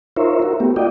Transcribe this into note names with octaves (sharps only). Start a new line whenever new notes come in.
D#4 F4 A#4 C5 C#5 E5
F#4 A#4
A3 B3 G4
F4 F#4 D5 D#5 G5